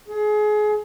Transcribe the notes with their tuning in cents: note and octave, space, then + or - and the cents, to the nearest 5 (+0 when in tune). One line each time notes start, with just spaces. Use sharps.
G#4 +30